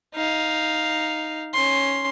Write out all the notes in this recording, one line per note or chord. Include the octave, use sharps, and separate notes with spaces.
D#4 F5
C#4 C6